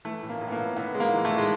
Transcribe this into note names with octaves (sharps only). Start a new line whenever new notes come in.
E3 A3
A2
A#3
A2
B3
A#3
A2
A2 B3
G#3
A#3
E3
A3
A2
G#3